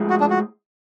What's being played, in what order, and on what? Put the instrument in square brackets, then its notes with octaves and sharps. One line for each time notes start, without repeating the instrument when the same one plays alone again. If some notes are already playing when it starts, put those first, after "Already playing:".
Already playing: [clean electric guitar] A2 F3 G#3
[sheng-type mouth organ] F#4
D4
F#4